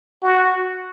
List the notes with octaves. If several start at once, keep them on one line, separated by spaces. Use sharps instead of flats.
F#4